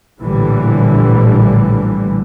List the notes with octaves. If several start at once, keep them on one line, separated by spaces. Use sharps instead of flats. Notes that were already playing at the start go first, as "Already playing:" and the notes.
A#1 A2 D3 E3 G3